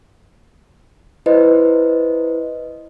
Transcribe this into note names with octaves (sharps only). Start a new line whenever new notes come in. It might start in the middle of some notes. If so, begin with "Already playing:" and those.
E4 B4 C5 D#5